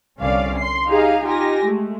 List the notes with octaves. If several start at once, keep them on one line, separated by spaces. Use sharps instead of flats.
C2 D3 C#4 D5 F5
C6 C7
D#4 G4 G#4 F5 A#5
D#4 F4 G4 G#5 A#6
G#3 A3